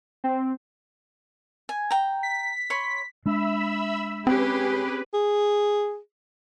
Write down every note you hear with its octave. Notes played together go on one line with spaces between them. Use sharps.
C4
G#5
G5 A#5
B6
C#5 B5 C6
G#3 D4 E5 B5 E6
C4 C#4 G4 G#4 B4
G#4